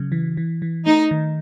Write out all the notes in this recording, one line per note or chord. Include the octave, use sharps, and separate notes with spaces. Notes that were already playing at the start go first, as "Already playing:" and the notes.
Already playing: C#3 F#3
E3
E3
E3
A3 D#4
D#3